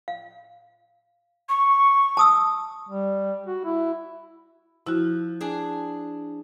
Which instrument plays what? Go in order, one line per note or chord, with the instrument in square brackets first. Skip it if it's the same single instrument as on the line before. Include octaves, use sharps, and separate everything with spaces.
[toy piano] F5
[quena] C#6
[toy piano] A5 D#6 E6
[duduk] G3
F#4
E4
[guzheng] F3 [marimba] E4 F#4
[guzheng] D4 G#4